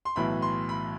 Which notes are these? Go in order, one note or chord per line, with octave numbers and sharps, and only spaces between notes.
C6
B1 A2 E3 B5
C6
B5